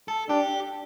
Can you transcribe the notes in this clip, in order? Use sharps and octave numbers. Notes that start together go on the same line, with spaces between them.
A4
D4 G4